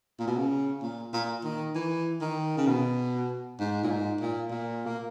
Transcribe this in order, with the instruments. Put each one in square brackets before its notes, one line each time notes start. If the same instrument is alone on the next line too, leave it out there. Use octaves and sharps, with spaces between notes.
[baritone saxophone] A#2
B2
C#3
A#2
A#2
D#3
E3
D#3
C#3
B2
G#2
A#2
G#2
A#2
A#2
A#3